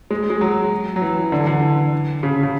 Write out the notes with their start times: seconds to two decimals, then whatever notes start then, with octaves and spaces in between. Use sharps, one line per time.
0.11 G#3
0.30 G#3
0.41 F#3
0.96 F#3
1.02 E3
1.32 D3
1.40 E3
1.47 D3
2.23 C#3
2.43 C#3